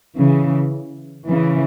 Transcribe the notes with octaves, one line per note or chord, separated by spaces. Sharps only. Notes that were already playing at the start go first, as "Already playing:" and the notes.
C#3 E3
C#3 E3